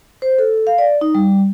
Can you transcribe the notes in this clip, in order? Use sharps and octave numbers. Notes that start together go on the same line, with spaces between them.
C5
A4
F5
D5
D#4
G3